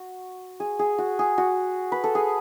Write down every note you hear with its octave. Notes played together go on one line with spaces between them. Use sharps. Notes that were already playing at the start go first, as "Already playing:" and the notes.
Already playing: F#4
G#4
G#4
F#4
G#4
F#4
B4
A4
G#4